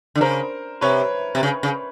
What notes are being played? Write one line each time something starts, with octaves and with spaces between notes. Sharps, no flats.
D3
C#3 A#4 C5
C3 B4 C#5
C3
C#3
C#3